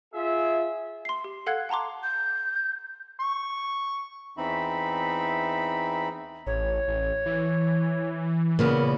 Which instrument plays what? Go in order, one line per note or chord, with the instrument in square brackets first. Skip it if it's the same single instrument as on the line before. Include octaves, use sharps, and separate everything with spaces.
[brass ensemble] F4 G#4 E5
[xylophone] C6 C7
G4
A4 F5 F#5 F#6 G#6
F#5 A5 A#5 C6 D6
[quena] G6
[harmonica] C#6
[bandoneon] E2 E3 C4 D#4 E5 B5
[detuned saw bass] A1 [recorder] C#5
[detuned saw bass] A1
E3
[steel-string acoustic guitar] A#2 C#3 B3 [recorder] A#4